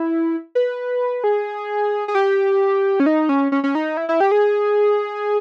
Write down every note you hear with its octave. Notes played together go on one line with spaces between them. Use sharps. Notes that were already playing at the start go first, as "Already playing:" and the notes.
Already playing: E4
B4
G#4
G#4
G4
C#4
D#4
C#4
C#4
C#4
D#4
E4
E4
G4
G#4